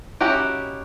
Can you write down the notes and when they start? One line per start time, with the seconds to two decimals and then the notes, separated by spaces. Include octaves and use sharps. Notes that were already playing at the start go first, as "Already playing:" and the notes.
0.21 C#4 D#4 E4 F#4 G4